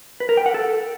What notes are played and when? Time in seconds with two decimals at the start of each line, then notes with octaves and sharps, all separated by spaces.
0.20 B4
0.29 A#4
0.37 G5
0.46 F#5
0.54 A4